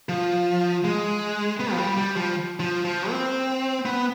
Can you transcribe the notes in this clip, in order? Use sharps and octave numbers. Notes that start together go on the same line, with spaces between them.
F3
G#3
B3
F3
G3
G3
F3
F3
F3
C4
B3